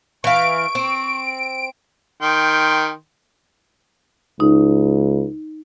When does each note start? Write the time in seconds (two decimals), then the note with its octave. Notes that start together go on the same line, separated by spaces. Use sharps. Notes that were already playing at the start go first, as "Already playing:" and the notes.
0.24 E3 F5 C#6 D7
0.75 C4
2.22 D#3 G5 C6
4.40 C#2 D#4